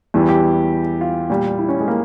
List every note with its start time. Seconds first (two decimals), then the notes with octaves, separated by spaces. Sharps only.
0.14 E2 E3 G3
0.29 G4
1.01 F4
1.30 A#2 G3
1.59 E4
1.69 C#4
1.81 G#3
1.88 A#3